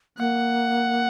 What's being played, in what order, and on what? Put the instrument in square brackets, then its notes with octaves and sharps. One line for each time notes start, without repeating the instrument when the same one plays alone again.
[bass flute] A#3 [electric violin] F#5